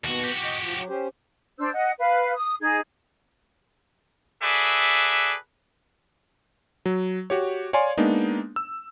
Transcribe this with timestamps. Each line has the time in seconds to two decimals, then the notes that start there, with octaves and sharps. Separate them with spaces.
0.04 D#2 B2 F#4
0.23 F#4 G4
0.45 D#5
0.62 F3
0.76 F#3
0.89 C#4 G4 C5
1.59 D4 C5 E6 G6
1.73 D#5 F#5
1.98 B4 F5
2.35 D#6
2.61 D#4 G#4 G#6
4.43 F#4 G#4 A4 B4 D5 E5
6.86 F#3
7.30 F#4 G4 C#5
7.73 C#5 D5 F5 G#5 C6
7.97 G#3 A#3 B3 D4 D#4
8.56 E6